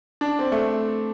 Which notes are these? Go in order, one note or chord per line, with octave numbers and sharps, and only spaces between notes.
D4
C4
A3